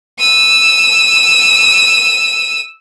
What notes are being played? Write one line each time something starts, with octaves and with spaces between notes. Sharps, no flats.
E6 D#7